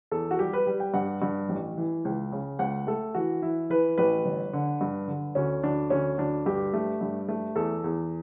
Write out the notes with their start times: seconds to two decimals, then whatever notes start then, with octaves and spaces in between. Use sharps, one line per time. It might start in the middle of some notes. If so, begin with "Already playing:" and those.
0.11 E2 A4
0.31 F#4
0.39 G3 G4
0.53 B4
0.67 G3
0.80 G5
0.94 G2 F#5
1.22 G2
1.49 A1
1.78 E3
2.05 C#2
2.32 C#3
2.59 C#2 F#5
2.87 A3 A4
3.15 E3 F#4
3.42 E3 E4
3.70 E3 B4
3.98 A1 B4
4.25 G1
4.53 D3
4.81 G2
5.08 D3
5.35 D2 C#4
5.63 D2 D4
5.90 D2 C#4
6.18 D2 D4
6.46 G2 G4
6.74 A3
7.01 G2
7.28 A3
7.56 E2 A4
7.84 E2